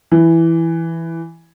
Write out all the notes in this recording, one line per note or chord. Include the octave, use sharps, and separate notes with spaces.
E3